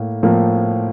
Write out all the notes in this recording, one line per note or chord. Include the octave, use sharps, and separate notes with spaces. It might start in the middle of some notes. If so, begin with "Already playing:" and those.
Already playing: A2 A#3
A2 F3 A#3